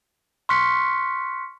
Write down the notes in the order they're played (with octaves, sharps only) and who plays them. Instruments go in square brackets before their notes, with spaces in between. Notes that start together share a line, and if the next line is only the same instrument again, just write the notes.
[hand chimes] C6 C#6 F6 F#6 B6 C#7